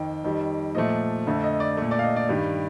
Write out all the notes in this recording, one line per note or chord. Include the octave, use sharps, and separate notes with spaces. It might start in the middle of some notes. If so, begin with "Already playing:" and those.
Already playing: F2 D#3 G5
F2 D#3 G3
A#2 F3 A3 D#5
F2 D3 A3
D#5
D5
A#2 A3
D5
F5
D#5
D5
G2 D#3 G3